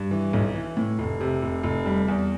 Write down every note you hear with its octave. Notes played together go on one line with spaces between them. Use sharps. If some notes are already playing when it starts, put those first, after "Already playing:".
Already playing: G2
E3
B1
E3
A2
F1
C3
F1
F1
G3
E2